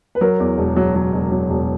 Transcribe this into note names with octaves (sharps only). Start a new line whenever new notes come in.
B4
F#3 A#4
E2
E1
F#3
F#3
E1
F#3
E1